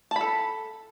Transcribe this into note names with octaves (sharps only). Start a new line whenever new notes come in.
A4 A5 B5